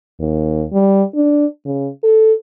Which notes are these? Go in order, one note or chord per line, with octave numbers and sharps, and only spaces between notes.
D#2
G3
D4
C#3
A4